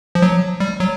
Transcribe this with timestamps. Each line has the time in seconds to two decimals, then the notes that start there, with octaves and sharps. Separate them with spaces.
0.15 F3
0.22 F#3
0.60 G3
0.80 F#3